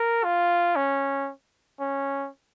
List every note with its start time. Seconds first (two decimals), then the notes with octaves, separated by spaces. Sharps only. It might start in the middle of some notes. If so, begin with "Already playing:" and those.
Already playing: A#4
0.24 F4
0.76 C#4
1.80 C#4